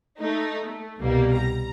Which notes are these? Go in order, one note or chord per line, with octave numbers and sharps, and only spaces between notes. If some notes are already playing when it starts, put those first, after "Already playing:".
A3 D#4
A3
C2 B2 G3 A#3
A#5